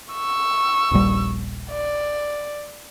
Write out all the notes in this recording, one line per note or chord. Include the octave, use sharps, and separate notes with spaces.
C#6 E6
D#1 A#1 G3
D5